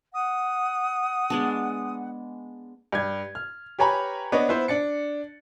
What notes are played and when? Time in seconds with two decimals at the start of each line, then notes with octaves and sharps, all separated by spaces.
0.14 F#5 D#6
1.30 G#3 B3 D4
2.92 G2 G#6
3.35 F6
3.79 G4 B4 C#5 G#5 A#5 B5
4.32 B3 D4 C#5 D#5
4.49 B3 E4 C5
4.68 D4 A6 C#7